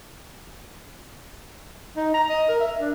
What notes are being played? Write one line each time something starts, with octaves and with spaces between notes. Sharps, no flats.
D#4
A#5
D#5
A#4
E5
D4